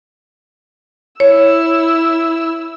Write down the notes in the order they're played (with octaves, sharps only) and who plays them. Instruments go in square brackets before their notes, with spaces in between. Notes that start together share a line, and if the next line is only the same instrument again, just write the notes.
[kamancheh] E4 E6 [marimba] C#5